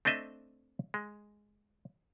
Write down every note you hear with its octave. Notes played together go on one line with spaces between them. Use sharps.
A3 C4 D4 D#5 E5
G#3